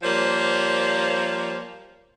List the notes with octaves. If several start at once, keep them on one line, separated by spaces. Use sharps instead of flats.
F3 G3 A#3 C5 C#5